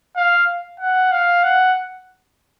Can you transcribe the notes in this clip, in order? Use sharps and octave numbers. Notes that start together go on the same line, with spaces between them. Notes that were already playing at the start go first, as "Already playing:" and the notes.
F5
F#5
F5
F#5